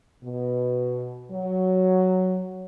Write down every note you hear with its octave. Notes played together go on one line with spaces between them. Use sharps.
B2
F#3